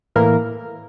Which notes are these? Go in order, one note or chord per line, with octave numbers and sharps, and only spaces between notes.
A2 E3 A#3 E4 A#4